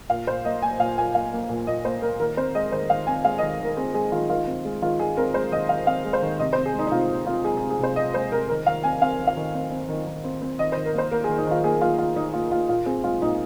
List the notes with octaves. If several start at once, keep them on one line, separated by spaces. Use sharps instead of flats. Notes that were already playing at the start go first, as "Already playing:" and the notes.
A#2 F5
A#2 C5
A#3 D#5
A#3 G#5
A#2 F5
A#2 G#5
A#3 F5
A#3
A#2
A#2 D#5
A#3 C5
A#3 A#4
D#3 A#4
C4 C5
G#3 D#5
D#3 C5
D#3 F5
C4 G#5
G#3 F5
D#3 D#5
D#3 A#4
C4 G#4
G#3 G#4
D#3 F4
D#3 F4
C4
G#3
D#3 F4
D#3 G#4
C4 A#4
G#3 C5
D#3 D#5
D#3 F5
C4 F5
G#3
C5
D#3
C3 D#5
C5
C4
G#4
G#3 D#4
D#4
C3 F4
C3
C4 F4
G#3 G#4
G#4
C3
G#4
C3 C5
C4 D#5
G#3 C5
C3 A#4
D#3 A#4
D#3 F5
C4 G#5
C4 F5
D#3
F5
D#3
C4
C4
D#3
D#3
C4
C4
D#3 D#5
C5
D#3
A#4
A#3 C5
A#3 A#4
G#4
D#3
D#4
D#3 F4
A#3 G#4
A#3 F4
D#3 F4
D#3 D#4
A#3 F4
A#3 F4
A#2 F4
C4 G#4
G#3 F4
A#2 D#4